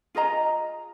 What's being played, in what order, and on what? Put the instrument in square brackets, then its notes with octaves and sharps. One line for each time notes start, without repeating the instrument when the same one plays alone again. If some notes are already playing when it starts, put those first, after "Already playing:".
[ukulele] F4 G#4 D#5 A#5